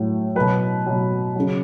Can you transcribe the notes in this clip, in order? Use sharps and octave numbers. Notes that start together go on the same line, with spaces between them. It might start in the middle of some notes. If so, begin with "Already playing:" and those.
Already playing: A2 F#3
B2 F#3 B4
B2 F#3
C#3 F#3